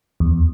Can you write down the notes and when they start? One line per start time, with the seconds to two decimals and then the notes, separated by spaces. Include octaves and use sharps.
0.20 E2